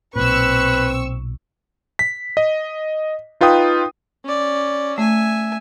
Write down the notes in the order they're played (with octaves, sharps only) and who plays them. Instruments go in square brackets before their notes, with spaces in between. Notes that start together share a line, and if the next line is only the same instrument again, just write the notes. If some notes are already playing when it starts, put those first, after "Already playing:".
[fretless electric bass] B1 A#2 [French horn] C4 [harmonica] B4 [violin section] C#6 E6
[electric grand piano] B6
D#5
D#4 F4 B4 G5 D#6
[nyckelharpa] C#4 D5
[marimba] A3 [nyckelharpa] E5 G#5